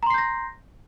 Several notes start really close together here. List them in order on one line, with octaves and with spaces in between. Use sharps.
A#5 C6 C7 G6 A#6